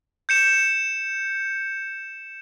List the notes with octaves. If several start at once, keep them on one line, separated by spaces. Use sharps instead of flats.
G6 C#7 E7